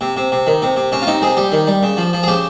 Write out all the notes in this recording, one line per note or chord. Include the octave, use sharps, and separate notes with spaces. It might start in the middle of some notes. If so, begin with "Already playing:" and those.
C3
C3
C3
D#3
C3
C3
C3 C#4
F4
C3 D#4
C3 G#4
G3 G4
D#3
G3
C#3
F3
F3
G#4
C#3 G4